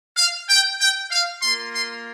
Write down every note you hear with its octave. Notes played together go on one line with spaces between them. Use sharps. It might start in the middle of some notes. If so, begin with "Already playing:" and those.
F5
G5
G5
F5
A#3 F4 C6
C6